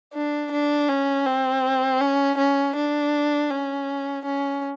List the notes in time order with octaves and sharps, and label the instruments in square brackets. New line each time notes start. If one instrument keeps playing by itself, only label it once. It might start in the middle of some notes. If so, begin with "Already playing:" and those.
[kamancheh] D4
D4
C#4
C4
C#4
C#4
D4
C#4
C#4